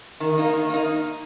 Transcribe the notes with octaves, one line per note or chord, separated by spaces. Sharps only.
D#3
A#3 D#4
D#3
A#3 D#4